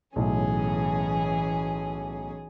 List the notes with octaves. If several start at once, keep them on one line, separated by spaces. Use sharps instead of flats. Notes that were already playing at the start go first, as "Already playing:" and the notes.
B1 A2 E3 C#4 G#4